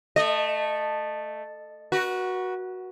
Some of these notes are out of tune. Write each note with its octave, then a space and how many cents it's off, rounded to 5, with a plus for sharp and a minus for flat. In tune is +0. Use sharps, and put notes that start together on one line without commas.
A3 +0 D#5 -25
F#4 +0 B4 -40